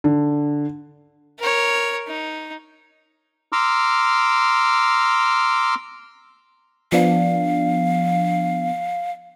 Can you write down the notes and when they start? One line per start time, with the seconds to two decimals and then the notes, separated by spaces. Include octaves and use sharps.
0.04 D3
1.39 A#4 C#5
2.07 D#4
3.52 A#5 C6 D6 E6 F6
6.92 F3 B3 D4 F5